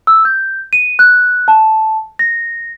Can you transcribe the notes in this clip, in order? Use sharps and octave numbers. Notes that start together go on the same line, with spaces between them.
E6
G6
D#7
F#6
A5
A#6